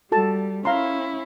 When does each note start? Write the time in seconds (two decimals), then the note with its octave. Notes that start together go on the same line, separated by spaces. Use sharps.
0.12 G3 F#4 A4 A5
0.65 C#4 E4 F5 A#5 C6